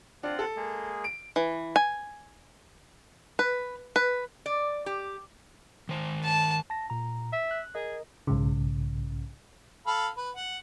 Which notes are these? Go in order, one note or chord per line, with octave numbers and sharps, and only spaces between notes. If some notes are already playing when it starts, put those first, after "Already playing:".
C4 D4 F4 F#5
A4
G#3 A#3 G#4
D7
E3
G#5
B4
B4
D5
G4
D#3 C5
A5
A5 A#6
A#2 A#5
E5
F#6
G#4 A#4 D#5
B1 G#2 C#3
A4 F5 B5
B4
F#5